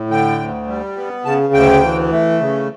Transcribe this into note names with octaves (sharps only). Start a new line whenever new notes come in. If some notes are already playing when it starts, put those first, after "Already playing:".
Already playing: A2
D3 G5
D2
G3
B3
C#3 A5
D2 G5
E3
A3
C#3